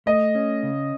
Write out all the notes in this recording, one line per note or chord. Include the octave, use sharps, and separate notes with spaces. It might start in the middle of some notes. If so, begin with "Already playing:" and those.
A3 D#5
C#4
C#3